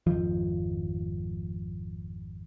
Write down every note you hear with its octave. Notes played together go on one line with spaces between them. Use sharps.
G#1 F2 F3